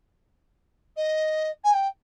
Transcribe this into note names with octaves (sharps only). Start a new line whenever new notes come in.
D#5
G#5
G5